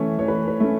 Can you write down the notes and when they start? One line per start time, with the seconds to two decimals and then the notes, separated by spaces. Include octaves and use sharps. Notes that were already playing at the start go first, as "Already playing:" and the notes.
Already playing: E3 A3 C#4
0.19 E3 C#5
0.28 B4
0.48 B4
0.60 A3 C#4